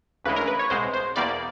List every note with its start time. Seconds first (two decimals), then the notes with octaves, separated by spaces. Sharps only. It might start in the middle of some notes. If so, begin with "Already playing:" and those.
0.24 D2 C#3 E3 G#3 B4
0.36 A#4
0.47 B4
0.59 C#5
0.70 C2 B2 G#3 C5
0.93 C5
1.16 E2 B2 G3 A#3 D5